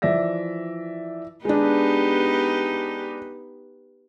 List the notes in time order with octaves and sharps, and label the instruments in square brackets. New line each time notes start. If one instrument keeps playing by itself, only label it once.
[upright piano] E3 F3 D5 E5 A#6
[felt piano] G#3 D4 [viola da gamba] B3 D#4 G4